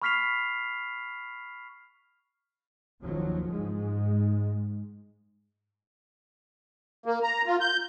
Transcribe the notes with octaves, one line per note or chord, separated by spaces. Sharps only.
B5 C#6 F6 B6 C7 F7
F#1 D#2 F3 F#3
G#2 G#3
A#3
A#5
F4
G6